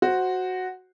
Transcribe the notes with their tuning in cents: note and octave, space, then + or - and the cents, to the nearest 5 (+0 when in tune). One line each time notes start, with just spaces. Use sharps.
F#4 +0 C5 +0